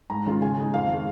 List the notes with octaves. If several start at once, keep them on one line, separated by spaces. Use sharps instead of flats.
G#2 A#5
D#3 G#3 C#4 F4
C#3 G#5
G#3 D#4
F2 F5
D#3 G#3